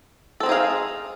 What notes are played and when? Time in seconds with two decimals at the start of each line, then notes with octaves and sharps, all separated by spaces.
0.40 A4
0.43 C4
0.46 D#4
0.49 G#4
0.52 F5